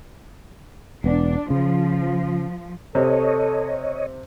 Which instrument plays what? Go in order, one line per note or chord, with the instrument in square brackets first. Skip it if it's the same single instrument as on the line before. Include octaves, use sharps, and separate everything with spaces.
[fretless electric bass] E1 B3 [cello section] D4
[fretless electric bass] C#3 [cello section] F3
[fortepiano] C3 [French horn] A4 [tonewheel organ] C#5 D#5